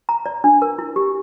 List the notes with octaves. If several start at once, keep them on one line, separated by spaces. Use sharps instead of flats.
A#5
D5
D4
A#4
E4
G4